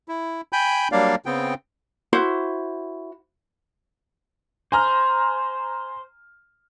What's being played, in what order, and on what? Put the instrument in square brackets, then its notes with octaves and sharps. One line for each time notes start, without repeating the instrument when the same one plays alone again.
[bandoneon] E4
G5 G#5 B5 G6
F#3 G3 A#3 D4 D5 F5
C#3 B3 C4 G5
[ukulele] E4 F#4 C5
[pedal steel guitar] C5 [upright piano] G#5 A#5 F6